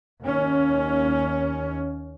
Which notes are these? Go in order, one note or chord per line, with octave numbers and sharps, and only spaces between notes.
D#2 C#4